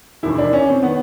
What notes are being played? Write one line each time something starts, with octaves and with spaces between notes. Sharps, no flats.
E1 D#2 D#3 E4
D4
C#4
C4
D#3 B3